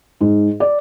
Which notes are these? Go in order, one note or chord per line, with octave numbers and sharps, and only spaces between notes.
G#2
D5